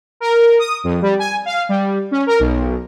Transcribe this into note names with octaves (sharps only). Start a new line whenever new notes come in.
A#4
D#6
F2
G3
G#5
F5
G3
C#4
A#4
B1